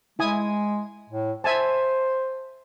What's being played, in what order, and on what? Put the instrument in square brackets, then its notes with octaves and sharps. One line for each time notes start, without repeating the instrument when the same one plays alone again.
[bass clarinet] G#3 [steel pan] E4 G#5 D#6
[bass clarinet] A2
[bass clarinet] C5 [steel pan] E5 G#5 A5